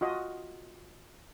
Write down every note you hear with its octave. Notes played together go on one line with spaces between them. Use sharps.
F4 F#4 D#5